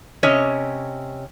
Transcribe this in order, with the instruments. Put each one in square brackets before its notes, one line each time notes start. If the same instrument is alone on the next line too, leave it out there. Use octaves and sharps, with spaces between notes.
[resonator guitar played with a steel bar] C3 C#4 C#5 D#5